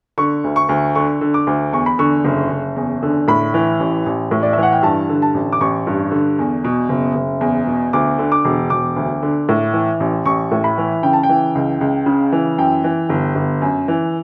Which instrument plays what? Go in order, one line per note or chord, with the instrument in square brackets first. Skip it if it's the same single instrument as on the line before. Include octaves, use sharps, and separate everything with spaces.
[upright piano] D3 C#6
D2
C#6
D2
D3 C#6
D3
D6
D2
E2 C#6
B5
D3 C#6
F#1
F#1
E2
D3
A2 B5
E3
A1
A1
A2
D5
E3 E5
F#5
G5
G2 A5
D3
A5
A1
D6
A1 C#6
G2
D3
E2
B2
F#1
F#1
E2
B2
D2 D6
D3
D6
E1
E1 D6
D2
D3
A2
E3
A1
A1 C#6
A2
B5
E3
C#3 G5
A5
G5
E3
C#2
C#2
C#3
E3
F#2 G5
E3
G1
G1
F#2
E3